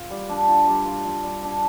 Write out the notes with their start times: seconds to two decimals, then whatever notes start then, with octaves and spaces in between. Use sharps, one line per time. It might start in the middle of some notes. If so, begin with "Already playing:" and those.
Already playing: F4
0.11 G3
0.29 D4
0.48 F4
0.67 G3
0.86 F4
1.05 F4
1.24 G3
1.43 D4